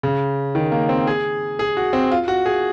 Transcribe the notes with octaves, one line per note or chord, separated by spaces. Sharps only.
C#3
D#3
A#3
C4
G#4
G#4
F#4
C4
F4
F#4
G#4